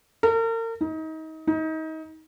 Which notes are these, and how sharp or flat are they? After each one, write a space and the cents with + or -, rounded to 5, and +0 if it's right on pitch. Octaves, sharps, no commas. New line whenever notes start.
A#4 -40
D#4 +30
D#4 +30